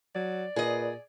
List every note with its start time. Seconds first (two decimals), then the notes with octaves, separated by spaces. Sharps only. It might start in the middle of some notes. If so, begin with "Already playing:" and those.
0.15 F#3 D5
0.56 A#2 G#4 B4 D#5